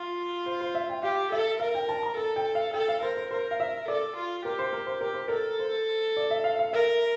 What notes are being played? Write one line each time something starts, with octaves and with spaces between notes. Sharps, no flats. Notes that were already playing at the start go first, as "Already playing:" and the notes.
Already playing: F4
C5
C5
E5
G5
G4 F5
A4 E5
A#4 F5
G5
A5
A#5
A4 A5
G5
F5
A4 G5
F5
A#4 C5
C5
A#4 C5
F5
E5
A4 D5
F4
G4 A#4
C5
A#4
C5
G4 A#4
C5
A4 A#4
C5
D5
E5
F5
F5
A#4 E5